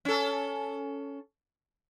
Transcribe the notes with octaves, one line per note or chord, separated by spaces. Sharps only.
C#4 A4